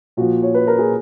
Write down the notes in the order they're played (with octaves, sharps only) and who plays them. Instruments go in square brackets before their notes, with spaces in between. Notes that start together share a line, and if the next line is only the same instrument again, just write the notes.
[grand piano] A#2 F3 F#4
C#5
B4
A#4
G#4